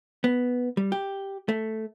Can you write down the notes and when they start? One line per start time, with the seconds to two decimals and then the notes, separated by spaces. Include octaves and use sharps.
0.24 B3
0.77 G3
0.92 G4
1.49 A3